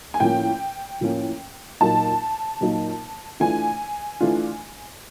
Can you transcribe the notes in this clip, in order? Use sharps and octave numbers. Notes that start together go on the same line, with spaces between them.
G#5
A2 F3 A#3 C#4 G5
A2 F3 A#3 C#4
A#2 F#3 A#3 D#4 A5
A#2 F#3 A#3 D#4
E3 A3 D4 F4 G#5
E3 A3 D4 F4